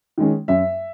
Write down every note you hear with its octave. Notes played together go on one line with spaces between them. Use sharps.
D#3 G#3 C#4
F#2 E5